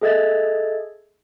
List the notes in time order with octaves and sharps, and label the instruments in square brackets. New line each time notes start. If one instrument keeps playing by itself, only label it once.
[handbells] G#4 A4 D#5 E5 G#6 A6